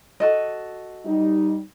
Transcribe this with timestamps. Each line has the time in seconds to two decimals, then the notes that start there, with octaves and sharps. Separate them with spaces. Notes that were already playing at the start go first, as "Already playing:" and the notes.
0.20 F#4 A4 D#5
1.06 G3 D#4